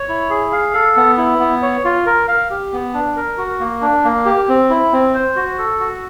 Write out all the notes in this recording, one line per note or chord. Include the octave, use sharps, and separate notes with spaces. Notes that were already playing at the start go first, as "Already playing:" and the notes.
Already playing: C#5
E4
G#4
F5
A4
B3
E4
B3
C#5
F4
A#4
F5
G4
B3
D4
A#4
F#4
A#3
D4
A#3
G4
C4
E4
C4
C5
F#4
A4
F#4